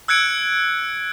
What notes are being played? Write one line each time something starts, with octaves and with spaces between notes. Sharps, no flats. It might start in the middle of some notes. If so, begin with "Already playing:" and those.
E6 F#6 G#6 C#7 D7